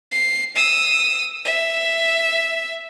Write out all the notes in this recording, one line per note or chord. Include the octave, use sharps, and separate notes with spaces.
C7
D#6 E6
E5